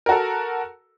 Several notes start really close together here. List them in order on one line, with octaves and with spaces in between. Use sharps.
A#4 F#4 A4